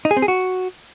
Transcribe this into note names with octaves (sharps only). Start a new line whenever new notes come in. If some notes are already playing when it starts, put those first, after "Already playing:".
D#4
G#4
C4
G#4
F#4